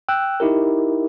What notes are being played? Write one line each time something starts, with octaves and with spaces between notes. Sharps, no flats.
G5 E6 F#6
D#4 E4 G4 A#4